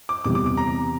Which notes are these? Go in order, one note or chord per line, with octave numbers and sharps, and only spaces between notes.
D6
E2 C3 E3 G3 D6
D6
D6
A#5